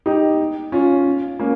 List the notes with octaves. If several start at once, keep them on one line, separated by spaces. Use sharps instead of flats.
D#4 G4
C#4 F4
A#3 C#4